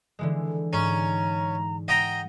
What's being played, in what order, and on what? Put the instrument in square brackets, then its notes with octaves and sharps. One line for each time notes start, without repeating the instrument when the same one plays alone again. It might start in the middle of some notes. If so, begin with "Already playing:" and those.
[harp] D3 E3 G#3
[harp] G#2 [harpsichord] C#4 [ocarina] A#5
[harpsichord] D#5 G5 A#5 [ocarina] F#5